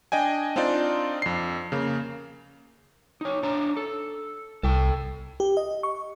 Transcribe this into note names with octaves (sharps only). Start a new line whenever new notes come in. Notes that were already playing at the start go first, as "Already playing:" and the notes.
D4 D#5 G5 G#5
C4 D4 D#4 F4 D5
F2 C7
C#3 A#3
D#4 C#5
D4 C#5 A#5
A4
C2 A4 G5
G4
D#5
C#6